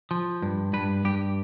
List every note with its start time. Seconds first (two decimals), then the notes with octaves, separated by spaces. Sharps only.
0.11 F3
0.42 G2
0.73 G2 B4
1.05 G2 G4